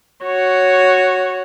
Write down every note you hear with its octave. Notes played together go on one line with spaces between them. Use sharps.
F#4 C#5